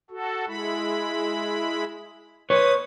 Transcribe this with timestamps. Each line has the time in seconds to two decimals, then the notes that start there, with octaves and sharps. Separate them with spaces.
0.11 F#4 A4
0.47 G#3 E4 B5
2.50 B4 C#5 D#6